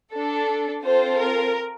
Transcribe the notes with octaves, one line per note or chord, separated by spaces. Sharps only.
D4 A4
C4 F4 A4 C5
A#4